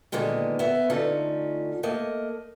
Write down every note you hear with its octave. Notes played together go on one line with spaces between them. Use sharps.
A#2 D3 D#3 G#3 B3
B3 E5
D3 A3 C#4 D#4 F4
A3 A#3 D#5